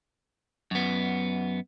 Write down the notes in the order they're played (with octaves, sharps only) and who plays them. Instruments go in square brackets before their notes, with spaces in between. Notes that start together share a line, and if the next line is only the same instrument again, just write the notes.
[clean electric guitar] F#2 B3